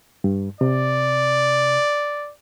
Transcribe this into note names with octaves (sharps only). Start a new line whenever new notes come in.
G2
C3 D5